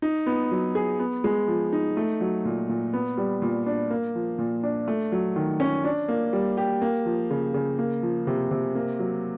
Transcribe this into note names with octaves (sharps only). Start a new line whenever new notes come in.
D#4
B3
F#3
G#4
B3
G#3
F3
D#4
A3
F#3
A#2
A#2
B3
G3
A#2
D4
A#3
F3
A#2
D4
A3
F#3
D#3
C#4
D4
A#3
G3
G4
A#3
F3
C#3
C#3
A#3
F3
C3
C3
A#3
F#3